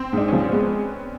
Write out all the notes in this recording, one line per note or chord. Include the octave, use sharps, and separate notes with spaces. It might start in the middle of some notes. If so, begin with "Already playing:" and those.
Already playing: C4
G#2 D4
F3 C#4
C4
G#3 B3